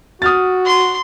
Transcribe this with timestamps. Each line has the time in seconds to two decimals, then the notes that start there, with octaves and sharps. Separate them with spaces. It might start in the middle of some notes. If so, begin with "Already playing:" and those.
0.22 F#4 D#6 F6 A6
0.65 C6